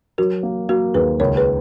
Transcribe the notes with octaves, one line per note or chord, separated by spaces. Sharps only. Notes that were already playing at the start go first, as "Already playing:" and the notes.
F#3 F#4 A#4
A#3
A#3 F#4 A#4
D#2 G#4 B4
C#2 A#4 C#5
G#4 B4